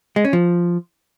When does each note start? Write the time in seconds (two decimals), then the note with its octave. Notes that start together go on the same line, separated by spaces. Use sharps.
0.16 G#3
0.25 C#4
0.33 F3